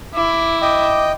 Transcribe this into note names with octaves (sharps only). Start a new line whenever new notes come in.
E4 D6
D#5 G5 D6